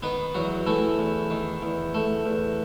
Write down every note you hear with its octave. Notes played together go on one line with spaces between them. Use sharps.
D#3 B3 B4
E2 F#3 F#4
E3 A3 E4
E2
D#3
E2
A3
E2